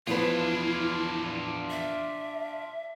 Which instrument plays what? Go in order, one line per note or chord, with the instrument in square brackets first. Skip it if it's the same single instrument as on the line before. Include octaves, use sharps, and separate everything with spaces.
[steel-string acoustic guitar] E2 F3 B4 [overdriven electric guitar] D4 F4 [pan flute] E4
[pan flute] E5